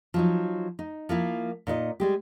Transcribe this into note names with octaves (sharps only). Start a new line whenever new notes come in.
F3 F#3 D#4
D#4
F3 A#3 E4
A#2 D#4 B4 D#5
G3 G#3 G4